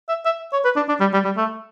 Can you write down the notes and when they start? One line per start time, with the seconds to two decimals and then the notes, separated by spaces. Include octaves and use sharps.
0.09 E5
0.25 E5
0.53 C#5
0.65 B4
0.76 D4
0.88 D4
1.00 G3
1.13 G3
1.25 G3
1.37 A3